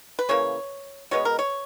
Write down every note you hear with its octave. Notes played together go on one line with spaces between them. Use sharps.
B4
C#3 E3 A#3 C#5
B2 G#3 B3 C#5
A#4
C#5